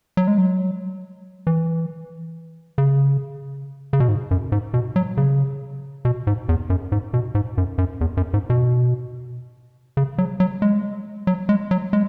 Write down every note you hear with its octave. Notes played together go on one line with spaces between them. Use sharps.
F#3
G#3
F#3
E3
C#3
C#3
B2
G#2
F#2
G#2
B2
F#3
C#3
B2
G#2
E2
F#2
G#2
B2
G#2
F#2
F#2
E2
F#2
G#2
B2
C#3
F#3
F#3
G#3
F#3
G#3
F#3
G#3